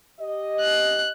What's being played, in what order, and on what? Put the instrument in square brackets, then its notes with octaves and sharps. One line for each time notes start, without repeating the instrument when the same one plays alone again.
[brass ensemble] G4 D#5
[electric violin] F#6